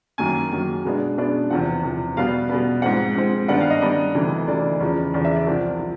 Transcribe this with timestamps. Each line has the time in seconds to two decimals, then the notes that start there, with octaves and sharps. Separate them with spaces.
0.18 F#2 D#3 F#3 A#3 G#5
0.51 F#2 D#3 F#3 A#3
0.85 B2 G#3 B3 D4
1.17 B2 G#3 B3 D4
1.50 E2 C3 F3 F#5
1.83 E2 C3 F3
2.17 B2 G3 B3 F5
2.49 B2 G3 B3
2.82 G#2 F3 G#3 C4 F#5
3.15 G#2 F3 G#3 C4
3.48 G2 D#3 G3 B3 D4 F#5
3.60 F5
3.70 D#5
3.81 G2 D#3 G3 B3 D4 D#5
4.15 D2 C3 E3
4.47 D2 C3 E3 D5
4.80 E2 C#3 F3
5.13 E2 C#3 F3 D5
5.25 E5
5.36 D5
5.47 C2 C3 F3
5.79 F3